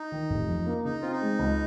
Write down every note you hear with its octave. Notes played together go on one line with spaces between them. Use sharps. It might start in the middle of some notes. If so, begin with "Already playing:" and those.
Already playing: D#4
D#3
F1
F2
A#3
C#3 D#4
C4 F4
D#4
G#3
C#2